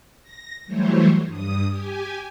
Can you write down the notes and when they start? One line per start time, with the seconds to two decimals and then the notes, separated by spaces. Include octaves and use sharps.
0.22 A#6
0.66 E3 F#3 G3 A3 C5 C#5
1.26 G2 D#6
1.68 G4 G#5